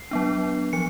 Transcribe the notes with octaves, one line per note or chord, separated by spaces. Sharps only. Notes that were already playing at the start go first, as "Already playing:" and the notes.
Already playing: C7
F#3 B3 D4
F3 C#7